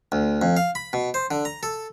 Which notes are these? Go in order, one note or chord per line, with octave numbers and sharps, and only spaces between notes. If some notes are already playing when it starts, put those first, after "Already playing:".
D2
F2
F5
B5
B2
C5
D3
A#5
A4